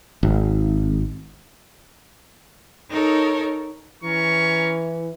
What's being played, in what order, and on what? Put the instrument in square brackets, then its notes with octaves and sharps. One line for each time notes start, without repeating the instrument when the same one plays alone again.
[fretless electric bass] G#1
[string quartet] D#4 A4 A#4 C#5
[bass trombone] E3 [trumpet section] C#4 A#5 C#6